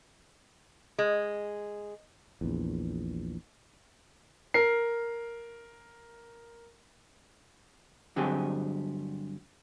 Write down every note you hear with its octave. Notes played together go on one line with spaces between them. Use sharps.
G#3
A#1 E2
A#4 C7
G2 D3 F#3 C4 G4 G#4